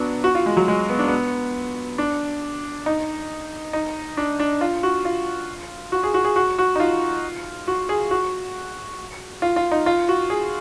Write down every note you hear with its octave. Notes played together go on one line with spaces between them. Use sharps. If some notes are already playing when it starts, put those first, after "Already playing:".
Already playing: F#3 B3 D4
F#4
F4
G#3
F#3
G#3
B3
D4
B3
D4
D#4
D#4
D4
D4
F4
F#4
F4
F#4
G#4
F#4
G#4
F#4
F#4
D#4
F4
F#4
G#4
F#4
F4
F4
D#4
F4
F#4
G#4